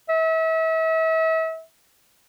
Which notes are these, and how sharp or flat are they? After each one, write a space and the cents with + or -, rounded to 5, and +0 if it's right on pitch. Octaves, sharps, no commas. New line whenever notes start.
E5 -35